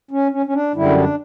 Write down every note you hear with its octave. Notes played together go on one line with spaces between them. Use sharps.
C#4
C#4
C#4
D4
F#2 D3 G3 E4
D4